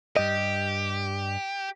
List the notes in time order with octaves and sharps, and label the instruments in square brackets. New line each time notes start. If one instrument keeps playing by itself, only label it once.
[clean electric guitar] G2 D#5 [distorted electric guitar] G4